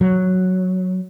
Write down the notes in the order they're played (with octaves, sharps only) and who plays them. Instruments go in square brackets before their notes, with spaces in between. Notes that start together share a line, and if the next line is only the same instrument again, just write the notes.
[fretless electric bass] F#3